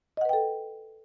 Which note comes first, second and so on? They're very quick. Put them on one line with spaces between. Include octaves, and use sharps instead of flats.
D#5 F#5 B4 G5 A4